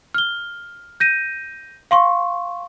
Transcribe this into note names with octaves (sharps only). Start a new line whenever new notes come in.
F6 G7
G6 A#6 D#7
F5 C6 C#6